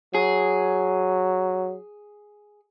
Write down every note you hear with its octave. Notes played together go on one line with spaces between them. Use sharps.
F#3 G#4